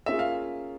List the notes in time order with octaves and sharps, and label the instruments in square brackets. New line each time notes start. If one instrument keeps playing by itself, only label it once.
[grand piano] A#3 C#4 F4 G#4 [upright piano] E5
[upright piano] F5